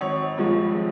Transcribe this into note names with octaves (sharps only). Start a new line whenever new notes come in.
G#1 C#5
G2 F3 G#3